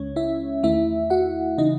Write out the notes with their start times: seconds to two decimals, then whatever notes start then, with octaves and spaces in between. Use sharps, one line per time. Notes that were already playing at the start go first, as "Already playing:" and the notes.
Already playing: C#2 C#3 G#3 C#4 C#5
0.16 E4 E5
0.63 E2 D#3 A3 E4 E5
1.10 F#4 F#5
1.58 C#3 E3 D#4 D#5